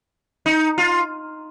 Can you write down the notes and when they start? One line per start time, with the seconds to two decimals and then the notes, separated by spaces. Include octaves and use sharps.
0.46 D#4
0.78 F4